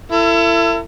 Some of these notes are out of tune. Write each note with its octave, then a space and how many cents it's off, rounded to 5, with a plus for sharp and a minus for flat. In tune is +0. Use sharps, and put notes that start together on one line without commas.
E4 +30 A4 +40